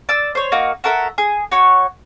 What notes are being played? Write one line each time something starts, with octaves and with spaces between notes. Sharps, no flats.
D5 E6
C5 C#5
A#3 D#4 F#4
F#4 A4 A#4 E5
G#4
F#4 C#5